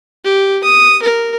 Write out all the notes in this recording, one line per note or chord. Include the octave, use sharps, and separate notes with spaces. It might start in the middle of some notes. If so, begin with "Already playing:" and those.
G4
D#6
A#4